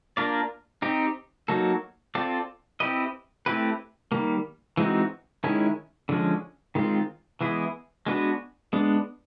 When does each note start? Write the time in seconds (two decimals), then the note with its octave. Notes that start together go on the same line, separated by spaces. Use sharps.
0.17 A#3 D4 F4 A#4 D5
0.82 C4 D#4 G4
1.48 F#3 A#3 D#4 F#4 A4
2.15 C4 F4 A4 D5
2.80 C4 E4 G4 B4 D#5
3.46 A3 C4 E4 G4 B4
4.12 D#3 G3 A#3
4.77 E3 G#3 C4 D#4 F#4
5.44 D#3 G#3 C#4 E4
6.09 D3 F3 G#3 C#4
6.75 D#3 G#3 C4 F4
7.41 E3 G#3 B3 E4 G#4
8.06 G#3 B3 D4 F#4 B4
8.73 G#3 B3 D4